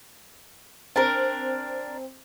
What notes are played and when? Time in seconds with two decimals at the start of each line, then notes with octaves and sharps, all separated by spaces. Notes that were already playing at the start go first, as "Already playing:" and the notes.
0.96 C4 D4 A#4